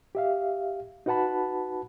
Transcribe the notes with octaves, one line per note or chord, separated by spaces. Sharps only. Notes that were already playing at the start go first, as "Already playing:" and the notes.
G4 E5 F5
D#4 F#4 B4 F#5 A5 B5